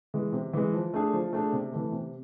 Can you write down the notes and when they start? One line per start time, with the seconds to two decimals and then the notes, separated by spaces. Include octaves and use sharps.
0.14 E3 G#3
0.33 C3
0.53 E3 G#3
0.73 F3
0.94 A3 D4 G#4
1.13 F3
1.33 A3 D4 G#4
1.53 C3
1.72 E3 A3
1.92 C3